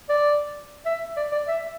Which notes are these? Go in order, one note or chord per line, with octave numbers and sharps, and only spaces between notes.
D5
E5
D5
D5
E5